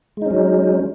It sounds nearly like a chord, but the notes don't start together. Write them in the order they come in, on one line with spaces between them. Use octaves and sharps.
G#3 D#4 C#4 F#3